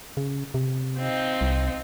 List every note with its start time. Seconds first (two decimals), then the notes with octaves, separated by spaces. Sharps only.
0.17 C#3
0.54 C3
0.97 C4 D#4 F4
1.41 C2